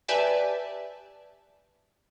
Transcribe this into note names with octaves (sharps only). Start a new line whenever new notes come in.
G4 B4 D5 E5 G#5 A5